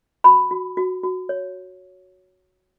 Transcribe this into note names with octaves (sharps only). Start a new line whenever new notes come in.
F#4 B5
F#4
F#4
F#4
C#5